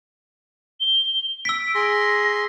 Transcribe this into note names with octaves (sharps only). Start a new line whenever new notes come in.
G7
E6 B6 D7
G#4 C6 A#6